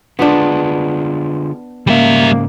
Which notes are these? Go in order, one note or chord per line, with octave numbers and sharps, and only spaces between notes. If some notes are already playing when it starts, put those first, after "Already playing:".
D3 B3 D4 F4 G#4
G#2 C#3 G3 A#3 E5